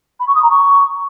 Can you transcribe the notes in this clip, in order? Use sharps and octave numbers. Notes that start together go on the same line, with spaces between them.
B5
C#6
D#6
A#5
C#6